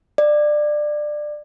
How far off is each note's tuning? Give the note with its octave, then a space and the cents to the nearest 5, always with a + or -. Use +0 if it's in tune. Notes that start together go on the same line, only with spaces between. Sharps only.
D5 +20